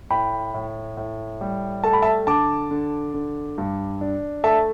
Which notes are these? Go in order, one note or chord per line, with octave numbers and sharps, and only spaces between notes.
A2 G5 B5
A2
A2
G3
A3 A5
B5
E5 A5
D3 A5 D6
D3
D3
G2
D4
A3 E5 A5